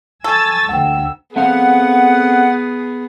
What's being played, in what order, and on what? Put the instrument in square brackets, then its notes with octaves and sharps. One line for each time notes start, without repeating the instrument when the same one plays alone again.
[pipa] A4 [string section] G#5 E6 A6 [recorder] C#6
[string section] D2 [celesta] F#5 G5 [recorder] E6
[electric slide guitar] A3 C4 F5 [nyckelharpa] B3 G#4 [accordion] F#5